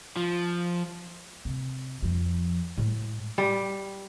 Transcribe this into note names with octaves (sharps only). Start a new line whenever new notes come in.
F3
C3
F2 F3
A2 G#3
G3